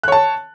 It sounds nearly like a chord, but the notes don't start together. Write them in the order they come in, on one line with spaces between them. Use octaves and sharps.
F#6 C#5 A5